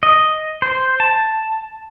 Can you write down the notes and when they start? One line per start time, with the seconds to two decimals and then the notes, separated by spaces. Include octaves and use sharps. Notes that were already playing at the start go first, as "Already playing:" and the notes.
0.03 D#5
0.62 C5
1.00 A5